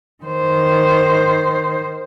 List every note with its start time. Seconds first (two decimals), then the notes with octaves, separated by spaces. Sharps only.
0.24 D#3 C5